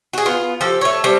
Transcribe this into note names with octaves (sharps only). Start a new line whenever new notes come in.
F#4 G#4
B3 F4
F3 G4 A4
A3 C#5
G3 A3 C4